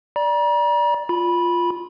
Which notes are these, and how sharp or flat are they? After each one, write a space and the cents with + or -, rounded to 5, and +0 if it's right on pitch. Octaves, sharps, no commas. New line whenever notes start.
D5 +0 A#5 +40
F4 +0 B5 -15